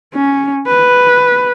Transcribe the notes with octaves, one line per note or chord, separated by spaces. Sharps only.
C#4
B4